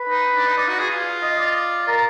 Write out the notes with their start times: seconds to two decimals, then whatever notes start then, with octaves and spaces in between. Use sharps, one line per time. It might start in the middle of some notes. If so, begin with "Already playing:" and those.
Already playing: B4
0.09 D#4
0.36 D4
0.46 D#4
0.57 D#4 D5
0.68 F#4
0.79 G#4
0.90 F4
1.22 D#5
1.39 D5
1.88 A#4